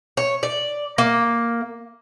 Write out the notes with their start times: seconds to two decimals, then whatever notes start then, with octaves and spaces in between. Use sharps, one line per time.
0.17 C#5
0.43 D5
0.98 A#3